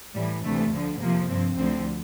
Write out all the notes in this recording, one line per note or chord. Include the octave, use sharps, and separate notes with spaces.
A2 E3 G3
D2 C3 E3 A3
D2 D3 F3
F2 C3 F3 A#3
G2 F3 C4
D2 D3 F3 C4